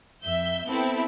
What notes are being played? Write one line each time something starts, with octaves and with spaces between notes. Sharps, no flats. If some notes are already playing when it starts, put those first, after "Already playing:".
F2 E5 G6
B3 C4 E4 A4